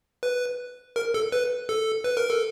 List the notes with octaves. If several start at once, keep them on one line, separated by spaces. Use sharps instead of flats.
B4
A#4
A4
B4
A4
B4
A#4
A4